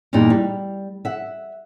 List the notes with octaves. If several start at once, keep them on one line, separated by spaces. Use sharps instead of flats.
E2 G2 A#2 G3 D#4
G3
E5 F#5